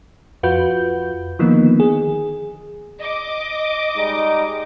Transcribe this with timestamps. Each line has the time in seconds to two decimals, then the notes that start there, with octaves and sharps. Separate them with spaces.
0.43 F2 F4 F#4 B4 G6
1.39 D3 D#3 F3 A#3 B3 D#4
1.80 G#4
2.99 D#5 D6
3.96 G3 G#3 D#4